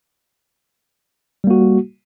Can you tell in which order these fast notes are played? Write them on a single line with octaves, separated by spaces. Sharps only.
G3 A#3 F#4